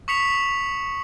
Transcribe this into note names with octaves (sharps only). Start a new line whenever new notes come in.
C#6 D#6 B6 C#7 F7